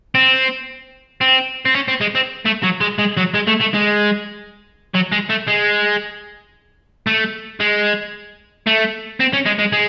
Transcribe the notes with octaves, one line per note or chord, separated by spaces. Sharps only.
C4
C4
C4
C#4
C4
G#3
C4
A3
F#3
G#3
G#3
F#3
G#3
A3
A3
G#3
F#3
G#3
A3
G#3
A3
G#3
A3
C4
C#4
G#3
G#3
G#3